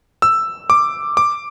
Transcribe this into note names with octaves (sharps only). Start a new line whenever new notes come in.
E6
D6
D6